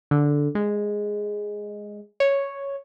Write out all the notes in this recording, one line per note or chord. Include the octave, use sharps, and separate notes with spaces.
D3
G#3
C#5